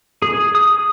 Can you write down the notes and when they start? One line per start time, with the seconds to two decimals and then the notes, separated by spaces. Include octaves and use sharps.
0.22 G#4
0.55 D#6